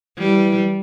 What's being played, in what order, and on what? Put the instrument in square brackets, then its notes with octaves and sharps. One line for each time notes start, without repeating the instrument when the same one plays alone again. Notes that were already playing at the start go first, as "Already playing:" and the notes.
[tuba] E3 [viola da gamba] G3